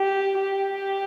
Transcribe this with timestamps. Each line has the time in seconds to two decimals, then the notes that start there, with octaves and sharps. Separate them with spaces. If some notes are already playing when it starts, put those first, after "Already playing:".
Already playing: G4
0.40 G4